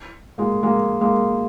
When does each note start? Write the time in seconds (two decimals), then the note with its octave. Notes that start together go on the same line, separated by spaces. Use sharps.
0.38 G#3 A#3
0.63 G#3 A#3
1.01 G#3 A#3